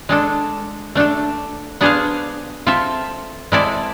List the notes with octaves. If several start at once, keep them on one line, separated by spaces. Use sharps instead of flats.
G#3 D4 A4
A3 D4 A4
B3 D4 G#4 C5 F5
C4 F4 A4 E5
G#3 C4 E4 A4 D5